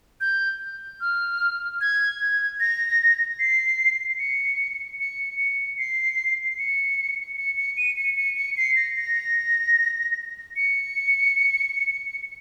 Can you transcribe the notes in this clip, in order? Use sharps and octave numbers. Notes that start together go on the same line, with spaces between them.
G6
F6
G#6
G#6
A#6
C7
C#7
C#7
C#7
C7
C#7
C#7
C#7
D#7
C#7
C#7
C#7
C7
A#6
A#6
C#7